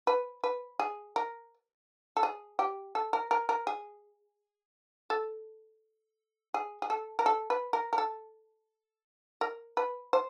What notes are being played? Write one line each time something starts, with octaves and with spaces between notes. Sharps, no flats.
B4
B4
G#4
A#4
A4
G#4
G4
A4
A#4
A#4
A#4
G#4
A4
G#4
G#4
A4
A#4
A4
B4
A#4
A#4
A4
A#4
B4
C5